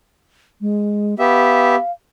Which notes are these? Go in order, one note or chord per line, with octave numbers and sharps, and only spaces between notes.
G#3
B3 G4 E5 F5